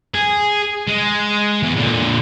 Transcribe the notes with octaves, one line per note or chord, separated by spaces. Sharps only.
G#4
G#3
E2
A#2 D3